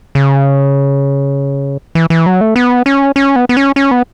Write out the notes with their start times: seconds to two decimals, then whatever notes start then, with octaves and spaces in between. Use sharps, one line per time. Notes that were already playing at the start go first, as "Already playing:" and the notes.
0.15 C#3
1.95 E3
2.10 E3
2.26 F#3
2.41 A3
2.56 B3
2.86 C#4
3.16 C#4
3.36 B3
3.49 B3
3.57 C#4
3.76 C#4
3.91 B3